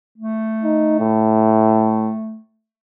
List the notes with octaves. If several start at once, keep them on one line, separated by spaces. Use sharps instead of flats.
A3
D#4
A2